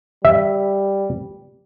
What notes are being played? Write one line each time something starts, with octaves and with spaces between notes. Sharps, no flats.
G3 E5